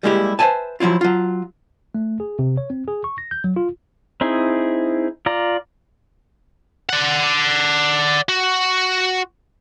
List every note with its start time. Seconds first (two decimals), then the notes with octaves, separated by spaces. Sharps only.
0.03 G3 G#3 A#3 E4 F4 G4
0.39 B4 C5 D5 E5 G#5 A5
0.80 F3 F#3 C#4 E4 F4
1.01 F#3 F4
1.95 A3
2.20 G#4
2.39 C3
2.57 C#5
2.70 C4
2.88 G#4
3.04 C#6
3.18 A#6
3.31 G6
3.44 F#3
3.56 F4
4.21 C4 D#4 E4 G#4
5.26 F4 D5 A#5
6.89 D5 F#5
8.29 F#4